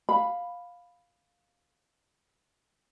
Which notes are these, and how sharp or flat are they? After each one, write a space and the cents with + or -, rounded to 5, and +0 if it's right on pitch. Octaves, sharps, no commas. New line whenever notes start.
F5 +10 B5 +0